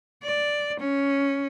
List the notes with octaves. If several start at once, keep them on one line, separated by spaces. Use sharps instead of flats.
D5
C#4